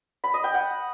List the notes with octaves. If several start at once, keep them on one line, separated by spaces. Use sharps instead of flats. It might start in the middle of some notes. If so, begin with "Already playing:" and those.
B5
D#5
G5
F#5